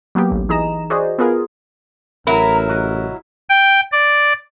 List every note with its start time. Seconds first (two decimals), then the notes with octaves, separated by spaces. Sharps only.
0.15 F#3 A#3 B3 G4
0.30 A1 D2
0.49 E3 D#4 G#4 D#5 A#5 E7
0.90 F#4 G#4 C5 D5 D#5
1.19 B3 F4 G#4 A#4
2.27 A1 F#3 E4 A#4 A#5
2.68 C2 F#4 D#5
3.50 G5
3.92 D5